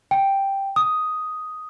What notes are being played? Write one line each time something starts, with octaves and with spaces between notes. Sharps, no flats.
G5
D#6